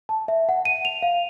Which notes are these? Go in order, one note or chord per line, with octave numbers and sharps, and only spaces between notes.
A5
E5
F#5
D#7
F7
F5